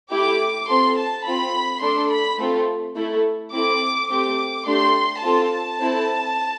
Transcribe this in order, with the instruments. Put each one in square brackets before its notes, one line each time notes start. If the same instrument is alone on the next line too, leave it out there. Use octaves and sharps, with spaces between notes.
[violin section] A3 E4 G4 D6
C4 F4 A4 C6
A5
C4 F4 A4 B5
A3 D4 A4 C6
B5
A3 C4 F4 A4
A3 E4 A4
C4 E4 A4 D6
A3 C4 G4 D6
A3 D4 G4 C6
C4 F4 A4 A5
C4 E4 A4